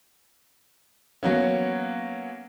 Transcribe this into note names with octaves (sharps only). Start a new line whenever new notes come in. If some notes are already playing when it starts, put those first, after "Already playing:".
F#3 A#3 B3 C#4